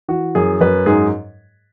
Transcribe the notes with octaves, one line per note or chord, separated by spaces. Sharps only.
E3 F#4
F#2 G#4
F#2 B4
G#2 G#4